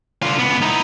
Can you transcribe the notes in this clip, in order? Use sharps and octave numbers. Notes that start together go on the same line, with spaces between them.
D3 F4
C#2 B3
D#4 E4